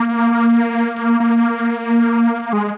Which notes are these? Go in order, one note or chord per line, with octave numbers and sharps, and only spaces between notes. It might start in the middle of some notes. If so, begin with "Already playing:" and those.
Already playing: A#3
A#3
G#3